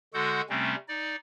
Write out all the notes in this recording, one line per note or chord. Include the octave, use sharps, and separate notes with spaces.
D3 G#3 F#4 A4 F#5 G6
C3 G3 A3 C4 C#4
D#4 D5